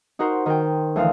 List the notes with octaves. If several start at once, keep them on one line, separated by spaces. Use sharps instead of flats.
D#4 F#4 A#4 C5
D#3 A#4 G5
D2 E3 F3 F5